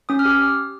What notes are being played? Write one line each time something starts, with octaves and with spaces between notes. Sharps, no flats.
C#4 D#6
F6
G4